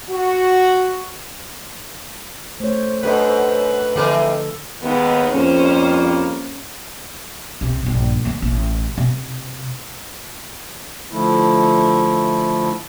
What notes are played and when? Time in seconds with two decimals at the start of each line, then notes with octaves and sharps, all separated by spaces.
0.11 F#4
2.60 A3 C5 C#5
3.03 F#2 D4 A4 B4 D#5
3.96 D3 E3 F3 C4 A4 A#4 D#5
4.20 D#5
4.83 D#2 G#3 B3
5.33 F2 G3 A#3 C#4 C5
7.61 C2 C3
7.83 A#1 G2
8.25 D#3 A#3
8.42 A1
8.98 C3
11.12 D3 F3 A3 E4